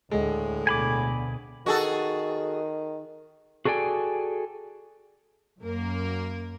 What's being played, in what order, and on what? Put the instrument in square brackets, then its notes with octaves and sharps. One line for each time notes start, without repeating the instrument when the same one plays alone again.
[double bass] D2 [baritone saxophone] A2 [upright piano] G#3
[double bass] D2 B2 [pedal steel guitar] G#5 B5 D6
[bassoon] D#3 [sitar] F#4 G#4 A4
[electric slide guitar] F#4 G#4 A4 D5 G5 G#5
[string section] F#2 A#3 A#4